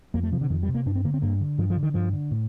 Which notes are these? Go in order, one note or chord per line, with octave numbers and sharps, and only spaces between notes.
F2 A#3
A3
C3 F3
D3
F2 D#3
G3
C3
A#3
G2 D4
C4
D3 A#3
C4
G2 A#3
D3
G2 F3
F3
D3
D#3
G2 F3
D3
A2